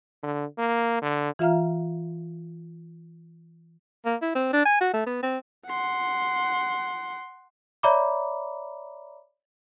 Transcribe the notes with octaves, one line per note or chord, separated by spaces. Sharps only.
D3
A#3
D3
E3 F4 E5 F5 A#5 F6
A#3
E4
C4
D4
G#5
F#4
A3
B3
C4
F#5 C6
C#5 D5 E5 A#5 B5 D6